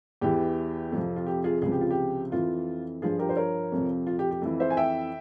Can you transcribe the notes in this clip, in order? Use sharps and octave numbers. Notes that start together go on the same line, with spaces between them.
E2 E3 G4
F2 C3 F3
F4
G4
F4 G#4
C#2 C3 F3 G#4
G4
F4
G4
F2 E3 F4
G2 F3 F4 G#4
G4 A#4
C5
A#4 C#5
F2 C3 F3
F4
G4
G4
F2 E3
C5 E5
G#5
E5 G5